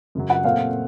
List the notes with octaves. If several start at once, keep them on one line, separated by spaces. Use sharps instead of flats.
F#2 C#3 F#3
F#5
A#2 A3 C4 F5